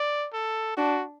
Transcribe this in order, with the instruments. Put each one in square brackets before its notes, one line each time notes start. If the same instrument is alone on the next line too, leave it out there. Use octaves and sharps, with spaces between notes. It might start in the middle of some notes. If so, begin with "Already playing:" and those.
Already playing: [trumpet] D5
A4
[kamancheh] D4 [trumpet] F#4